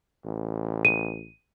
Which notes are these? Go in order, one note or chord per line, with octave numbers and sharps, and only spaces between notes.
A1
D#7